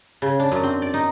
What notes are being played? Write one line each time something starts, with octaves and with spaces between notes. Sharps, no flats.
C#3
D4
F#2
C4
D5
D#4